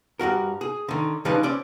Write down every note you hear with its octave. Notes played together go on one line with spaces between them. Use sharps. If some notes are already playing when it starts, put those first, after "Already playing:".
G2 B2 F#4 A#4
G#4
D3 D#3
C#3 F3 G3 D4 D#4 B4
C4 C#4 D5